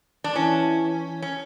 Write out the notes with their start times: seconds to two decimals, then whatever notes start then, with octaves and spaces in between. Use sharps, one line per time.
0.24 D4
0.36 E3 C#4
1.22 C#4